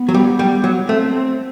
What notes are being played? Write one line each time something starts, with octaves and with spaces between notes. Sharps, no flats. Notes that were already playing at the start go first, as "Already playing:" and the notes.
Already playing: B3
F#3
G3
G3
F#3
A3 C4